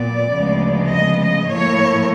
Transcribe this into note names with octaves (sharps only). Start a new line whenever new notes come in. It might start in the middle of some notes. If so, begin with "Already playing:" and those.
Already playing: A#2 F#3 B3 D5
D2 C#3 F3 G#3 B3
D#5
D#5
A2 F3 A#3 C#5